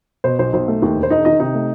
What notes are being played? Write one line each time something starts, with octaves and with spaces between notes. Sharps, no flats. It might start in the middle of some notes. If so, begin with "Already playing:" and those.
B2 C5
B1 C5
B1 C5
A3
D#2
E1
C5
E1 D#4 D#5
D#3 D#4 D#5
C3 D#4 D#5
A3